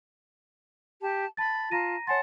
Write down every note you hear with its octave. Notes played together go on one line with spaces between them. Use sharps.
G4 A5
A5 B5 A6
F4 A5 A#5 A#6 D#7
C#5 F#5 G#5 A5 C6 A6